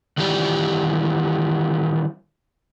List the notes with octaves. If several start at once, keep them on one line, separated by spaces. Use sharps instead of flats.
D#3 E3 G3 G4 D5